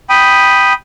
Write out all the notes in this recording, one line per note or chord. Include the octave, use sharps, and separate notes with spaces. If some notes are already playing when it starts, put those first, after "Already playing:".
G5 B5 D#6